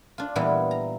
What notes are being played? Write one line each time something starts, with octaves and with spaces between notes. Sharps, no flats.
D4 F4
A#2 E3 G3 B3 E4 F4
A#5